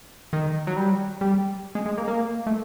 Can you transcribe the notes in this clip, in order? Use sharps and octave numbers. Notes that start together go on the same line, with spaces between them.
D#3
F#3
G3
G3
G#3
G#3
A#3
A#3
A3